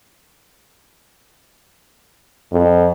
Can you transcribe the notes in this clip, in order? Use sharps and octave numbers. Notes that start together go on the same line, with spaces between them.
F2